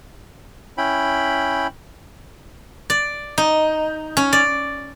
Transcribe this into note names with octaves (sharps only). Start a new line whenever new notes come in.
C#4 E4 G5 B5
D5
D#4
C#4
D5